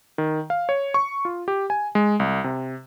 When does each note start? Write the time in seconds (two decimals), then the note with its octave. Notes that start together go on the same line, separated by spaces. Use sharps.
0.18 D#3
0.50 F5
0.69 C#5
0.94 C#6
1.25 F4
1.48 G4
1.70 G#5
1.95 G#3
2.20 C2
2.44 C3